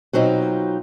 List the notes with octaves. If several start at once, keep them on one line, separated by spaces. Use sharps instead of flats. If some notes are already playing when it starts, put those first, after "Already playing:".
B2 F#3 C4 D#4 F4